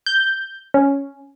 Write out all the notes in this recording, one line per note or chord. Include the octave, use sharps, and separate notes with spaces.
G6
C#4